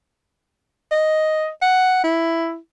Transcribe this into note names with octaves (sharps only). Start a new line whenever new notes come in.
D#5
F#5
E4